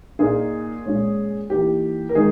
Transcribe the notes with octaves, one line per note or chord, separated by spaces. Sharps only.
A#2 A#3 D#4 G#4
A#2 G#3 C#4
E3 A#3 D#4 G4
A#4
D#3 G#3 D#4 G#4